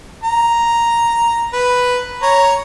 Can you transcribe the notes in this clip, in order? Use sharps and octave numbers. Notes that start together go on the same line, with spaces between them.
A#5
B4
C#5 A#5